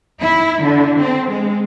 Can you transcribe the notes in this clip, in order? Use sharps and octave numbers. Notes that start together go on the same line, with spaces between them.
E4
D3
C4
G#3